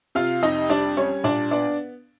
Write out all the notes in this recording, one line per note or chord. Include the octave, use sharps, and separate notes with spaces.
C3 F4 F5
F2 D#4 D#5
G3 D4 D5
G3 C#4 C#5
A#2 D4 D5
B3 D4 D5